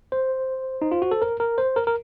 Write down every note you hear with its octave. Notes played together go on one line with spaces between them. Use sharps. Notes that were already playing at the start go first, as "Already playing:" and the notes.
C5
D#4
F4
F#4
A4
A#4
A#4
C5
A#4
A#4